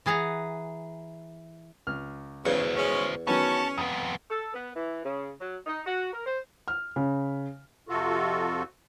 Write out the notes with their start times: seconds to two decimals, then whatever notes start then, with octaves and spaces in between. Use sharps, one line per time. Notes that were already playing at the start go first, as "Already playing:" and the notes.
0.06 E3 G#4 F#5 A#5
1.87 C#2 F6
2.45 E2 C#3 F#4 C5
2.77 G#3 C#4
3.27 D#3 F#3 B3 C#4 A5
3.78 F2 B3 D#6
4.29 A4
4.53 B3
4.75 E3
5.04 C#3
5.40 F#3
5.66 D#4
5.86 F#4
6.13 A#4
6.25 C5
6.68 F6
6.96 C#3
7.89 F2 C3 F4 F#4 A4